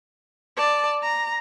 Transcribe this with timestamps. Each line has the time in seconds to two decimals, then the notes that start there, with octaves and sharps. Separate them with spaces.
0.57 D5 A5
1.02 A#5